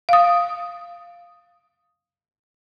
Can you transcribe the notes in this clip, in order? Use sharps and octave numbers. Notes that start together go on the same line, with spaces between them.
F5 D#6